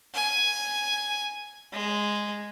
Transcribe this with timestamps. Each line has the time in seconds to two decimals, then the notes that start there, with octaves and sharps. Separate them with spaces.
0.14 G#5
1.73 G#3